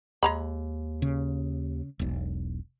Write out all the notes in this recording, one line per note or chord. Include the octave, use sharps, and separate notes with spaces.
D#2 G#3 A#5 B5
C#3
E1 B1